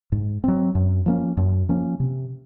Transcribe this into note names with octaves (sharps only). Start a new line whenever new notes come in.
G#2
F#3 C4
F#2
F3 A#3 C#4
F#2
F3 A#3 C#4
C3